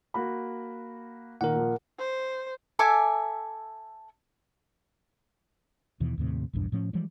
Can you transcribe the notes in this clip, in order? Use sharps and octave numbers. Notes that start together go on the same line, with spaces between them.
A#3 F#4 B5
A#2 D#3 A#4 F#5
A#2 F3
C5
A4 E5 G#5 D6
D#2 B2 E3
D#2 A2 C3
A#1 E2 G2 D4
A2 F3 C#4
E3 F3 G3 G#3